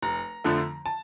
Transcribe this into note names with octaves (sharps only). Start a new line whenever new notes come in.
F1 A#5
F2 D3 F3 A3
A5